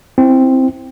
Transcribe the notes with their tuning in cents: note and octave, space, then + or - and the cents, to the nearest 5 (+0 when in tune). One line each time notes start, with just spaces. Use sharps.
C4 +0 E4 +0